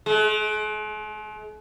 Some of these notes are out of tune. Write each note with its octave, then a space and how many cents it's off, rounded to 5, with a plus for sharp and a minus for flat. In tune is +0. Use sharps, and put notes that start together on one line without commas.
G#3 +45